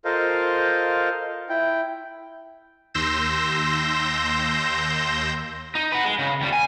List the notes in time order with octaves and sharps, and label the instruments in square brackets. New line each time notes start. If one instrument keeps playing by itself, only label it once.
[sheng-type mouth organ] F4 A4 A#4 C5 D#5 F5
E4 G5
[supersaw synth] D#2 C6 E6 G6 A#6 E7
[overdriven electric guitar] D#4
F#4 B4
G#3
C#3
D#2 G3
G#5